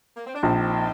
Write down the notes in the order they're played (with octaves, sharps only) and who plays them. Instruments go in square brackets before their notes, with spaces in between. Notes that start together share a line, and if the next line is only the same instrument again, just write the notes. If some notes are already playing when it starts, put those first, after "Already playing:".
[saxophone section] A#3
C4
D4
[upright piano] A#1 [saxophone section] C4 D#4